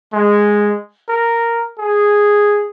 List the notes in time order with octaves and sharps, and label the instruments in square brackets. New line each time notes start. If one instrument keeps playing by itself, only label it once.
[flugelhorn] G#3
A#4
G#4